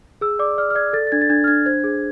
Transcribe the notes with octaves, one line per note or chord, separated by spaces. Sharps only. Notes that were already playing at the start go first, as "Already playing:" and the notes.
G#4 E6
D5 D6
D5 F6
F6
D5 G#6
A4 A6
A6
D4 G#6
A6
D4 G#6
F6
D4 G#6
C5 G#6
G#4